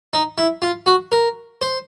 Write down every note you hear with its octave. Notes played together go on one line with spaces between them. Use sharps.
D#4
E4
F4
F#4
A#4
C5